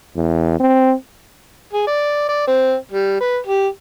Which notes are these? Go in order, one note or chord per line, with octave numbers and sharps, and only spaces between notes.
E2
C4
G#4
D5
D5
C4
G3
B4
G4